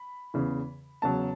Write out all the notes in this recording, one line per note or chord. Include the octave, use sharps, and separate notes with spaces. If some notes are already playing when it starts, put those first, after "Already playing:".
Already playing: B5
E2 C#3 E3
E2 C#3 F#3 A5